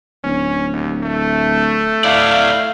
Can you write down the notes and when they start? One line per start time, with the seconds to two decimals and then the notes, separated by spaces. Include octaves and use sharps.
0.24 D1 C#4
0.73 D#2
1.03 A3
2.04 E4 D5 F5